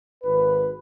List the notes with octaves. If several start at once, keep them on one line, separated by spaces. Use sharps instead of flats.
G#1 B4